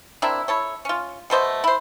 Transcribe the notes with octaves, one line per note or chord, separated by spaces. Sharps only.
A#3 C4 D4 E4
E4 A4 C#5
C#4 F4
B2 A3 C5 D#5
E4 C5